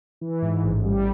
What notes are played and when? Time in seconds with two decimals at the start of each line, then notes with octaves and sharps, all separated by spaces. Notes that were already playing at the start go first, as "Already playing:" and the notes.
0.21 E3
0.42 G#2
0.63 A1
0.85 G3